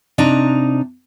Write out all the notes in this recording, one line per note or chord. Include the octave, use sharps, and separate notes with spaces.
C3 D4 D#4 A#5